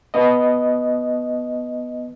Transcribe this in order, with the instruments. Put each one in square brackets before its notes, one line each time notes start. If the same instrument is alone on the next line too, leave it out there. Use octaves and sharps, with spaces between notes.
[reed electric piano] B3 D#5